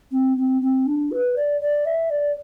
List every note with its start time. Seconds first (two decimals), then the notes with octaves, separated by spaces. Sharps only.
0.11 C4
0.37 C4
0.61 C4
0.86 D4
1.11 B4
1.36 D5
1.61 D5
1.85 E5
2.10 D5